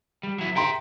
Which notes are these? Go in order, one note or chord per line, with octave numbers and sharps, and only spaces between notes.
G3
F#3 E4
E5 G5 A#5 C6